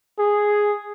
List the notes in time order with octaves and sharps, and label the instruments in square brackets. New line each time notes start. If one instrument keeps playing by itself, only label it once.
[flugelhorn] G#4